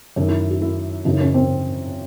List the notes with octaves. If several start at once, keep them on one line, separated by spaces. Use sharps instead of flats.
F#2 D#3 F#4
E4
F#4
E4
F#2 C#3 E3 D#4
C#4
C4